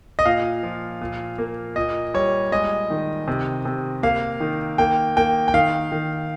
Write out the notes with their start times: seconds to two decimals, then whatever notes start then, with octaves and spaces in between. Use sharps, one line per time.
0.19 D#5
0.25 A#2 F5
0.63 F3
1.01 A#2
1.38 A#3
1.76 A#2 D#5
2.14 G3 C#5
2.52 G#3 D#5
2.90 D#3
3.28 C3
3.65 C3
4.03 A#3 F5
4.40 D#3
4.78 A#3 G5
5.17 A#3 G5
5.48 G5
5.54 D#3 F5
5.92 D#3